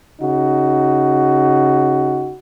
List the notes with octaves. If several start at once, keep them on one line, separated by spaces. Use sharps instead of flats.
C#3 D#4 F#4